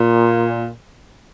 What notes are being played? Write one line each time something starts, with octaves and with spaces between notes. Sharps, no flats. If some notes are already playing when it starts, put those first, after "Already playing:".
Already playing: A#2